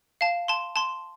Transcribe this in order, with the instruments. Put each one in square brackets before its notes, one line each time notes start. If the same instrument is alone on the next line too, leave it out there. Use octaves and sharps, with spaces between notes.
[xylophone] F5 A5
A5 C6
A5 C6